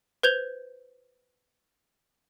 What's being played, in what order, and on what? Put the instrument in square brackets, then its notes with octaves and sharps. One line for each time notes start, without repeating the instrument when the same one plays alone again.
[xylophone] B4 C5 G6 G#6 F7 G7